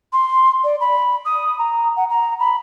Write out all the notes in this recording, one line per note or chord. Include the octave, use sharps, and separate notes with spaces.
C6
D5
B5
D#6
A#5
F#5
A#5
B5